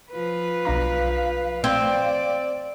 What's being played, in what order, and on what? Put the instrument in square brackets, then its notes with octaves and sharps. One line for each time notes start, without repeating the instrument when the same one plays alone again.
[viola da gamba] F3 B4
[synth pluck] B1 D4 A#5 [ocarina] F5
[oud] C4 [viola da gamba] D5